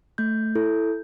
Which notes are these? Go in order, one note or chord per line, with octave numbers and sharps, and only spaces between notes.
A3 G6
E4 A4